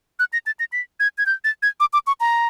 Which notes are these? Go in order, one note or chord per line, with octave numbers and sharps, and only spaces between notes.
F#6
A#6
A6
A#6
B6
G#6
G#6
G6
A6
G#6
D6
D6
C#6
A#5